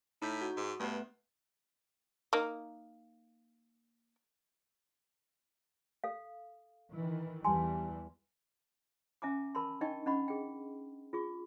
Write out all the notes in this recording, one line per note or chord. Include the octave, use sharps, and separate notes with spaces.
A2 D#4 G6 B6
F#4
G#2
G2 A3 B3 B4
A#3 D#4
A4 F5
D#3 E3
E2 E3 G3 G#5 A5 C6
C#4 E5 G#5 A#5 D6
A#4 A5 B5 C6
D4 D#4 D#5 G5 A5 C#6
C#4 D4 D#5 F#5 B5 C#6
G#4 G5
F4 G#4 C#6